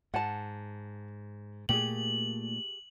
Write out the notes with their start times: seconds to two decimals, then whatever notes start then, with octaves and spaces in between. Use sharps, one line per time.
0.14 G#2 F#5 A5
1.69 A#2 A3 G4 G#4 F#7